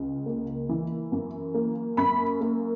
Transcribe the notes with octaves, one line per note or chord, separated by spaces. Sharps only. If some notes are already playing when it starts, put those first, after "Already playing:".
Already playing: C#2 C#3
A#3
E3
F#2
A#3
F#2 B5
A#3